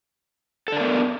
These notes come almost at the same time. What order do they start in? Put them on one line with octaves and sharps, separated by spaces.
A4 D4 A#4 B3